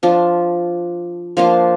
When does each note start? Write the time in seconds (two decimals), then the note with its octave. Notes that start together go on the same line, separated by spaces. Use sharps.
0.03 F3 D4 F4
1.37 F3 A#3 D4 F4 C5 F5